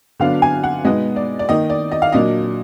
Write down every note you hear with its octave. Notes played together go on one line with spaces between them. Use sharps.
D3 F#3 B3 D4 F5
G#5
F#5
B2 G#3 B3 D#4 D#5
D5
D5
D#3 A#3 D#4 D#5
D5
D#5
F5
A#2 F#3 A#3 D4 D#5